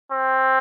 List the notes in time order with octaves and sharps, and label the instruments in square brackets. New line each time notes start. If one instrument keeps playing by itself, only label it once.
[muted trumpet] C4